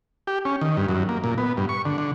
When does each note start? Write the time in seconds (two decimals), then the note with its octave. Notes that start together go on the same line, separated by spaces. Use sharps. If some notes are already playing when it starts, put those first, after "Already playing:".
0.27 G4
0.45 C#4
0.61 D#3
0.77 G2
0.89 F#2
1.09 A#3
1.24 A#2
1.38 B3
1.57 G2
1.69 C#6
1.85 D3
1.98 D3